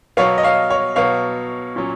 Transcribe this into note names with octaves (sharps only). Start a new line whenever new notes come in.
B2 F#3 B3 C#5 F5
D#5
C#5 F5
C#5
B2 F#3 B3 C#5 F5
A#2 F#3 C#4